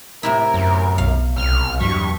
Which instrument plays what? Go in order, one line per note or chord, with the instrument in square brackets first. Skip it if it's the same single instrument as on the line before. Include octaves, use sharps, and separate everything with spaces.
[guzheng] A2 C3 E4 [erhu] A#4
[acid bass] F#2
[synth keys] B1 [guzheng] F5
[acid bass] C2 [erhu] F6
[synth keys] E2 F#3 B6 [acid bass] G2 [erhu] C#6